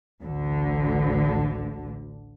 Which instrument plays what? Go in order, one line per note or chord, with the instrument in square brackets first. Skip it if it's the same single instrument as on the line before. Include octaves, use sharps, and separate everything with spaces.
[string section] A1 D2 D3